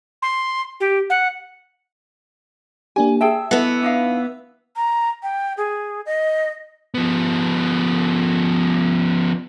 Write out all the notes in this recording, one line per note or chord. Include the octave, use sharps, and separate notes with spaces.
C6
G4
F#5
A#3 D4 G4 G#5
G#4 E5 G5 A5 E6
E3 B3 A4 D#5 F#5
D4 D#4 F5
A#5
G5
G#4
D#5
F3 B3